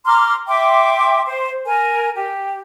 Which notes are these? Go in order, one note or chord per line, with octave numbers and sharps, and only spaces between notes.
A#5 C6 D6 F6
E5 G5 C6 D6
C5
A#4 G#5
G4